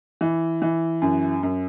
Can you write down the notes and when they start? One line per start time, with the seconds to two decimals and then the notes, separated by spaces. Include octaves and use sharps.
0.21 E3
0.62 E3
1.02 F#2
1.43 F#2